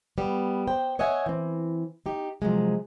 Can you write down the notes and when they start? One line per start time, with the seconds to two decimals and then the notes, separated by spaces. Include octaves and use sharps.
0.18 G3 B3
0.67 C5 G5
0.99 C#5 D#5 E5 F#5 G#5
1.26 E3 C4
2.06 D#4 G4
2.42 C3 F3 F#3 G#3